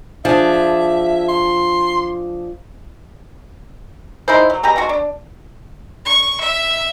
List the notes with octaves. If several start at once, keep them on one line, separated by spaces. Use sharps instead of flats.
F3 D4 G#4 E5
C6
D#4 E4 G#4 C5
F#3
B2 G4 G#4 A#5
C3 G#3 F#4 C#6
D4
C#6
E5